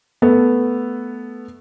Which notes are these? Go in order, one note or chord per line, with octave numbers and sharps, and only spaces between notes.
A3 B3